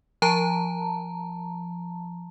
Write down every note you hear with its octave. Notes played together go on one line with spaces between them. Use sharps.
F3 A5 A#5